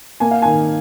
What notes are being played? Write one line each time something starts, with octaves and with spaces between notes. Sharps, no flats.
A#3 G#5
F5
D#3 G#5